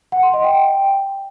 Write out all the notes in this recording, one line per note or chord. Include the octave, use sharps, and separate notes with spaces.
F#5
C6
D#5
G5